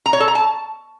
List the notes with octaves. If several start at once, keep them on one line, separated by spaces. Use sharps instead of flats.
A#5
C#5
A4
A#5
A5